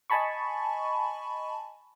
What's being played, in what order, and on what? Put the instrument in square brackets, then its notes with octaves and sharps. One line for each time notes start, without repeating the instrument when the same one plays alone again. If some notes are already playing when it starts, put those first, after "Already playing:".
[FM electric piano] D#5 G#5 A5 B5 C#6